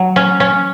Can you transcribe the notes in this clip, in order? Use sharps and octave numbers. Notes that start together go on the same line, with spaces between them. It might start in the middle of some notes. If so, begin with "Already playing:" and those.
Already playing: F#3
C#4
C#4